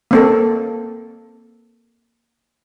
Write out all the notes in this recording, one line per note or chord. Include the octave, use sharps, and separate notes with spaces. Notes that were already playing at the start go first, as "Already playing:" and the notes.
A#3 C4 A4